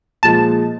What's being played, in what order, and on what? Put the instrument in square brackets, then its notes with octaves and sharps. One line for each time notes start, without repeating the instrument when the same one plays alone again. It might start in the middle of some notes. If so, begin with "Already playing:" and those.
[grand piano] A#2 F3 G#3 [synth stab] A5